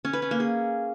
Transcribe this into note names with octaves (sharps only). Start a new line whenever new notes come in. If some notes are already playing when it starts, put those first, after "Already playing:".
C#4
B4
C#4
A#3
G#4